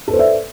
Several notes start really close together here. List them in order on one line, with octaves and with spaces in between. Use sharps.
A4 B4 C5 D5 E5